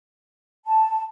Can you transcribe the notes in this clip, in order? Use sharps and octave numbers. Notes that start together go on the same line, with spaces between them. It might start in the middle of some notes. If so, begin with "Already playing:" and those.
A5